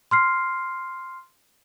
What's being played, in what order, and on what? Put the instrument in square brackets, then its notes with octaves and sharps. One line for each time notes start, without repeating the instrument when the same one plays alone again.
[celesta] C6 F6 C7